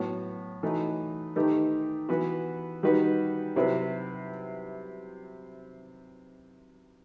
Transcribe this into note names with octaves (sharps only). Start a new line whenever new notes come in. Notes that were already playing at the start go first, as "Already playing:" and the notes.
Already playing: A2 F#3 B3
E3 A3 D#4 F#4
D#3 A3 D#4 G4 B4
E3 B3 F#4 B4
D#3 G3 D#4 F#4 B4
C3 F#3 C4 E4 B4